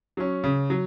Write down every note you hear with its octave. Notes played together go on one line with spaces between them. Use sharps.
F#3 C#4
C#3
F#3